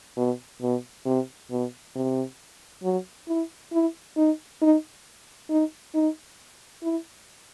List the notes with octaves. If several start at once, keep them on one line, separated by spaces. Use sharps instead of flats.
B2
B2
C3
B2
C3
F#3
E4
E4
D#4
D#4
D#4
D#4
E4